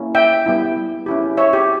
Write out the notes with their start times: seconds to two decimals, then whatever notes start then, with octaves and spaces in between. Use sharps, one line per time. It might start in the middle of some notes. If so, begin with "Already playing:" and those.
Already playing: A#3 C#4 E4
0.15 E5 G5
0.46 G3 B3 E4
1.06 C#4 E4 G4
1.37 C#5 E5
1.53 G4